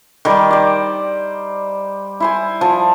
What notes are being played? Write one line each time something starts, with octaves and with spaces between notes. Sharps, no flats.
D#3 G3 D6
C5 D5
E4 C5 G#5
F3